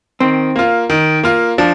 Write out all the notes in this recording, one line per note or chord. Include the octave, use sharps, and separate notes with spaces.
D#3 C4
A#3 F4
D#3
A#3 F4
F3 D4